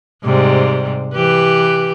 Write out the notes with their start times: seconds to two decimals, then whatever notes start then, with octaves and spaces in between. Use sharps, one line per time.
0.24 G#2 C3 G3
1.14 E3 G4 B4